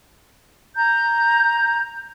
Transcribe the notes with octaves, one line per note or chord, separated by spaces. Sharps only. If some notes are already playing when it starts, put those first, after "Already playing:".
A#5 G6